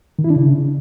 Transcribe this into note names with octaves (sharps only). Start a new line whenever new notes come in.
D#3
E4
D4
C#3